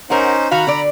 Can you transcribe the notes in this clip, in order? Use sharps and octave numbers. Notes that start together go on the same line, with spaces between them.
C#4 D#4 A#4 C5 F#5
D#3 F#4 F5 A#5 B5
D3 D5